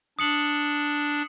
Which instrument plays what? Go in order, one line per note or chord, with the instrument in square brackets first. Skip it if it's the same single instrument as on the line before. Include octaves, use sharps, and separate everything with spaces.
[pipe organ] D4 [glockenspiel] D#6 C#7 F#7